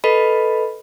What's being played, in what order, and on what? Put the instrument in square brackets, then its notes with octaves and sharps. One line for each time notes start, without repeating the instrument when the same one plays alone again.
[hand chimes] A4 B4 D#5 B5